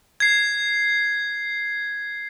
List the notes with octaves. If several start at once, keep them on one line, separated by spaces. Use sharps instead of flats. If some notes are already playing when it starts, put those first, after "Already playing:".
G#6 C7